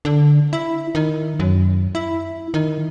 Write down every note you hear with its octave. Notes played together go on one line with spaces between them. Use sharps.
D3
E4
D#3
F#2
E4
D#3